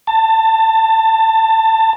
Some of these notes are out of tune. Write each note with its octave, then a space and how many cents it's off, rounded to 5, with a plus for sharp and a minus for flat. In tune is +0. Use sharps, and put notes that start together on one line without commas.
A5 +20